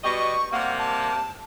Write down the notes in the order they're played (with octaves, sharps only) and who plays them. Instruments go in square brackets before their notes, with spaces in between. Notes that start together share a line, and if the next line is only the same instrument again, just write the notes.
[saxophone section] B2 G3 D#5 [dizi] C#6
[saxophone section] C3 G3 A#3 [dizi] F#5
[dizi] A5